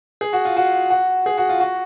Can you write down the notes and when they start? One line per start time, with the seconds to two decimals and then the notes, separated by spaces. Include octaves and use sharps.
0.21 G#4
0.33 F#4
0.45 F4
0.57 F#4
0.90 F#4
1.26 G#4
1.38 F#4
1.49 F4
1.60 F#4